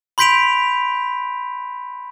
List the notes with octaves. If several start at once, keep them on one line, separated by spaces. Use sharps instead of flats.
B5 C6 G6 B6 D7 F7